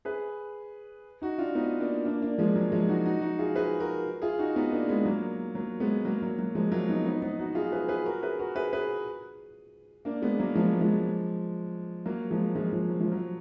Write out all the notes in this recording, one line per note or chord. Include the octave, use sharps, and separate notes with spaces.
G#4 B4
D#4 F#4
D4 F4
B3 D#4
A#3 D4
A#3 D4
A#3 D4
F3 G#3
F#3
F3 G#3
D#4 F#4
D#4 F#4
D#4 F#4
F4 G#4
G#4 B4
F#4 A#4
F4 G#4
D#4 F#4
B3 D#4
A#3 D4
G#3 B3
F#3 A#3
F#3 A#3
G#3 B3
F#3 A#3
F#3
F#3
F3 G#3
F#3 A#3
B3 D#4
B3 D#4
B3 D#4
D#4 F#4
F4 G#4
G#4 B4
G#4 B4
F#4 A#4
G#4 B4
F#4 A#4
G#4 B4
G#4 B4
A#3 D4
G#3 B3
F#3 A#3
F3 G#3
F3 G#3
F#3 A#3
F3 G#3
F3 G#3
F3
F#3
F3
F#3